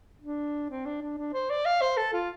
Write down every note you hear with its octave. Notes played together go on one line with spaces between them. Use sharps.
D4
C4
D4
D4
D4
C5
D5
F5
C5
A4
F4